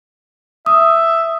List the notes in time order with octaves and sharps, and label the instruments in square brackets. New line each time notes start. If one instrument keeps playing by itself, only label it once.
[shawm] E5 [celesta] D#6